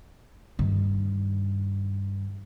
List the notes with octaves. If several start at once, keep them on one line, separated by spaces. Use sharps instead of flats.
G2 D#3